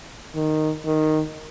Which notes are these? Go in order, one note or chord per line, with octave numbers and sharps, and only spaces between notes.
D#3
D#3